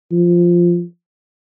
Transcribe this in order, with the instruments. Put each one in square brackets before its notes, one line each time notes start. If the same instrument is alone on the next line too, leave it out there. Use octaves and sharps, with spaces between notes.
[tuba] F3